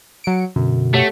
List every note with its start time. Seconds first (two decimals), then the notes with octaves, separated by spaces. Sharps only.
0.24 F#3 C#7 D7
0.56 F#2 B2 D3
0.94 A3 G4 C#5 F#5